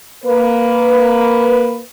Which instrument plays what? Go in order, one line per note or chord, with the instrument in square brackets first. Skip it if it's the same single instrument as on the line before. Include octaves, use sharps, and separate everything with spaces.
[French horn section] A#3 B4